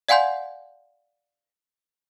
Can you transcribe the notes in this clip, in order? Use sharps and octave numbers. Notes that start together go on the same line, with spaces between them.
D5 F5 F#5 G#5 C6 G6